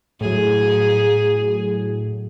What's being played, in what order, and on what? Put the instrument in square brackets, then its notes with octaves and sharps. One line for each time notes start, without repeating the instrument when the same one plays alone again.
[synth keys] A2 F#3 [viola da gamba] G#4